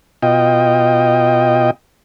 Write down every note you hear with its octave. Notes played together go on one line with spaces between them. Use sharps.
B2 F4 D#5 G5